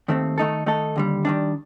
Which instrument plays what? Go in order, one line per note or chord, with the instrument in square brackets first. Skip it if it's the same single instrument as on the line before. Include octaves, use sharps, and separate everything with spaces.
[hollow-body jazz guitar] D#2 D#3 A3 C4
D#3 A3 D#4 A4
D#3 A3 D#4 A4
D#2 D3 G3
D#3 G3 D4